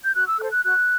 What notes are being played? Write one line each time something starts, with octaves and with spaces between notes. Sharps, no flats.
G6
F#4 F#6
E6
A4 C5 F#6
F#6
F#4 F#6